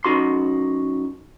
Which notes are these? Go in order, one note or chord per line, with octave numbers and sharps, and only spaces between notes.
F#2 D#4 F#4 C6